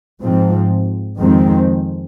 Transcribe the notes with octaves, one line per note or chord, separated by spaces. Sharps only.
G#2 F3 C4
F2 D#3 G#3 C4